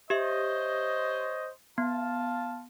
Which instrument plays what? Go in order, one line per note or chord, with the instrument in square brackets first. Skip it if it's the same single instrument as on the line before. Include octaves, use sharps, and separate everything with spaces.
[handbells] G4 E5 [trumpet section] C5 C#5 D#5
[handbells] B3 [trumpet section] F4 A5